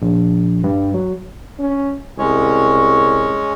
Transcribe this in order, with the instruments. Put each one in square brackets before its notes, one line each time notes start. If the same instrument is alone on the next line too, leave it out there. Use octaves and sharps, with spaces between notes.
[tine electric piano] A#1
G2
F#3
[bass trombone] C#4
[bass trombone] C2 [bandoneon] G#3 C#4 C#5